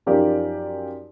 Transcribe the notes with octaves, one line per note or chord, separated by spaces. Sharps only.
F#2 F3 D#4 G4 A#4 D5